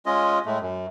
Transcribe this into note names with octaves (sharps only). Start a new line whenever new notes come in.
G#3 C#4 F4 D#5
A2 G#3 A3
F#2